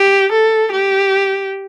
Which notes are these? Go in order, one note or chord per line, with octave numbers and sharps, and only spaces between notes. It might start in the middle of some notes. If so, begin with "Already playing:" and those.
Already playing: G4
A4
G4